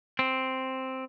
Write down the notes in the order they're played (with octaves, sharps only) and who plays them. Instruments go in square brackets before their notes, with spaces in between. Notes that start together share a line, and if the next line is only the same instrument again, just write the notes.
[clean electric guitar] C4